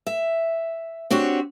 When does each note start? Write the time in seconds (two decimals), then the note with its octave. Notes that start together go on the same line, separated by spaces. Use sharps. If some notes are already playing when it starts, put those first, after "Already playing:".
0.06 E5
1.10 C4 D4 F#4 G4 C#5